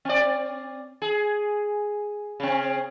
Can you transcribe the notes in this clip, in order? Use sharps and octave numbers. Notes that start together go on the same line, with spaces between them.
C4 D5
G#4
C#3 C4